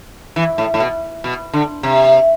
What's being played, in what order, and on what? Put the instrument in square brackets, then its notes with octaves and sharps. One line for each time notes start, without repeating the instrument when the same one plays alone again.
[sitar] E3
A2
A2
B2
B2
D3
C3